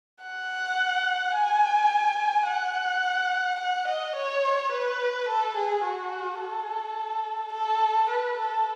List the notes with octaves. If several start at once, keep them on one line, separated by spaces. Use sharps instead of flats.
F#5
G#5
F#5
F#5
D#5
C#5
B4
A4
G#4
F#4
A4
A4
B4
A4